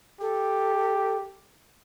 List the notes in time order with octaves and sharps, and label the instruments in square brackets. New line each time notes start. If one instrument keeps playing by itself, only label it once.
[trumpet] G4 [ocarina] A4